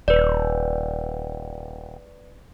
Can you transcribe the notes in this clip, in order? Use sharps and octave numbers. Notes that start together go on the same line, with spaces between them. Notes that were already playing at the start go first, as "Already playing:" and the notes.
D#1 B4 D5